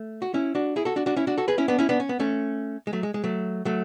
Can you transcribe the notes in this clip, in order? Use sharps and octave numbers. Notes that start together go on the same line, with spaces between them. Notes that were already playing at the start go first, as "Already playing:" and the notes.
Already playing: A3
F#4
C#4 E4
D4 F#4
E4 G#4
F#4 A4
D4 F#4
D4 F#4
C#4 E4
D4 F#4
F#4 A4
G#4 B4
C#4 E4
B3 D4
C#4 E4
B3 D4
C#4
B3
A3 C#4
G#3
F#3 A3
G#3
G#3
F#3 A3
F#3 A3